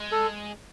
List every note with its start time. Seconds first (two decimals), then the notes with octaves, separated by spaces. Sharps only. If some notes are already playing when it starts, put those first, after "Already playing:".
Already playing: G#3
0.12 A4